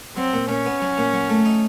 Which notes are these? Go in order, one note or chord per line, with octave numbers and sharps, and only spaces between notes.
F#3 C4
A#2
A#2 C#4
B3
F#3
A#2
F#3
A3
D#4